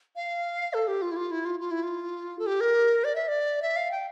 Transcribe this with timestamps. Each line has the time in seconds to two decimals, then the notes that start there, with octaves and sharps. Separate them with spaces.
0.16 F5
0.74 A4
0.88 G4
1.02 F4
1.11 E4
1.16 F4
1.31 E4
1.45 F4
1.60 F4
1.71 E4
1.83 F4
2.39 A4
2.47 G4
2.61 A#4
3.04 D5
3.16 E5
3.28 D5
3.62 E5
3.76 F5
3.91 G5